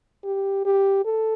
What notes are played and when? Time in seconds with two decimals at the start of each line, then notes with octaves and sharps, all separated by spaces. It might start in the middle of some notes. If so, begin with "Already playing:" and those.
0.24 G4
0.65 G4
1.05 A4